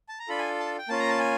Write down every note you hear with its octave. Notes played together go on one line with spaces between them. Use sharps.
A5
A#5
D4 F4 A4 B5
G#5
A5
G5
A#3 C#4 F4 A5
A#5
A5
G#5